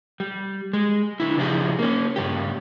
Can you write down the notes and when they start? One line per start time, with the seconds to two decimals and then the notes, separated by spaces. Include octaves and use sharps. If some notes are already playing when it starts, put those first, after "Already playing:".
0.20 G3
0.73 G#3
1.20 D3 E4
1.37 C#3 F3 D#4 E4 G4 G#4
1.79 A#3 C#4
2.16 G2 C#3 G4